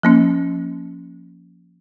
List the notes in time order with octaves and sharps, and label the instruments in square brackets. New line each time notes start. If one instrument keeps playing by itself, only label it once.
[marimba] F3 A#3 C#4